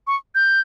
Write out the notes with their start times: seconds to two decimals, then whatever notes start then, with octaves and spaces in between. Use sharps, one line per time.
0.07 C#6
0.35 G6